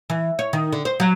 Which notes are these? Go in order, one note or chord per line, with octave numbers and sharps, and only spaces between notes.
E3
C#5
D#3
D3
C5
F#3